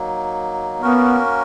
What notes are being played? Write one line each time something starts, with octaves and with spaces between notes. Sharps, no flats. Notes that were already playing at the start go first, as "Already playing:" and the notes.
Already playing: F#3 A#3 D#4
A#3 B3 C#4 F#4 A#4